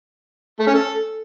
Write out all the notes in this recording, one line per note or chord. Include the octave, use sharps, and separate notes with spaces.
A3
C#4
A4